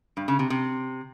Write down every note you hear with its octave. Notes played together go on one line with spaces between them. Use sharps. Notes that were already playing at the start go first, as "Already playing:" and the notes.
G2
C#3
C3
C3